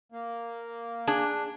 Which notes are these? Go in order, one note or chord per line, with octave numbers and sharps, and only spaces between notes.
A#3
D4 G#4